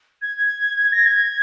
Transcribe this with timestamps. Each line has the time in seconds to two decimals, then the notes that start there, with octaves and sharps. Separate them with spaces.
0.21 G#6
0.92 A#6
1.05 G#6